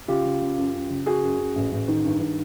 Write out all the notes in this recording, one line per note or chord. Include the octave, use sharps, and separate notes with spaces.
C#3 F4 G4
C#3
C#3
F#2
F#2
C#3
C#3 F#4 G#4
F#2
F#2
A1
A1
D#3
G2
D#3